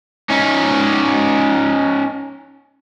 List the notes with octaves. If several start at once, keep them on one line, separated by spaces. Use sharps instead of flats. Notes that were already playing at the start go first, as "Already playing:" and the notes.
C#4 D#4